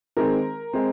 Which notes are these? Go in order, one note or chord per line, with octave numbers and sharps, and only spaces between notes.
D#3 G#3 C4 A#4
G#3 C4